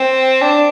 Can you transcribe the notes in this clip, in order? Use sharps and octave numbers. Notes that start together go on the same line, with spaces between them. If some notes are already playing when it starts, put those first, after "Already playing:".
Already playing: C4
D4